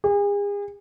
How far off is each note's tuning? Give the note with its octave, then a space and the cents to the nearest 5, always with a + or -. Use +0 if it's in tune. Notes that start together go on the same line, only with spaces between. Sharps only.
G#4 -40